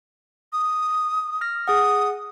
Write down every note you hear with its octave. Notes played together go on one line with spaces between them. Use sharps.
D#6
F6 A#6
G#4 F#5 D#6